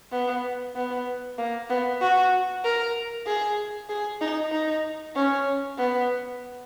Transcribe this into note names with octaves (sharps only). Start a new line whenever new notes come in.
B3
B3
A#3
B3
F#4
A#4
G#4
G#4
D#4
D#4
C#4
B3